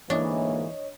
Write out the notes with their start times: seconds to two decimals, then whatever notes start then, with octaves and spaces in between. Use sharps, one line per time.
0.10 D2 G#2 E3 A#3 D4 C#5 D#5